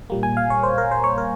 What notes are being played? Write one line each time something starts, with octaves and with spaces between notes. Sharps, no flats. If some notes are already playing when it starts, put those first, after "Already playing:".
A#2 G3 A#3
G#5
F5
C#5
C5
A#4
C5
C#5
A#4